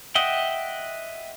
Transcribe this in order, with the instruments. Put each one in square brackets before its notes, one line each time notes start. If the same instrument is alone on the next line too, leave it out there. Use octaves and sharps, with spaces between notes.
[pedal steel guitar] D#5 E5 F#5 G5